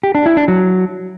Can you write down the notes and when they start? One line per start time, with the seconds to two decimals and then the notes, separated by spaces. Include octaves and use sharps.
0.03 G4
0.15 D4
0.26 E4
0.37 D4
0.48 F#3